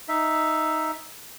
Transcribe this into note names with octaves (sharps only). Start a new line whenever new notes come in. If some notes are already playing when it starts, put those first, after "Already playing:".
D#4 E5